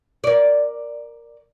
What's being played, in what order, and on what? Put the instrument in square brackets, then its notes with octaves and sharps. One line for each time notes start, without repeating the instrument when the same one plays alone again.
[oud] A#4 D5